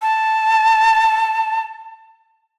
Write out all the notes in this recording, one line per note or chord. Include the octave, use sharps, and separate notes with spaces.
A5